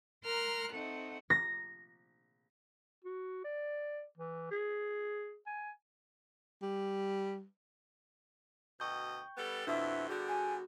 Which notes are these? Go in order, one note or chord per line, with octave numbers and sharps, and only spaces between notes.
A#4 A#5 C6 F6 F#6
A3 C4 D#4 F#5
A#6
F#4
D5
E3
G#4
G#5
G3
D2 B2 D#5 G5 C#6 G6
G3 B3 A4
F2 B2 D4 E4 E5 E6
D3 G3 B3 F#4 G#4
G#5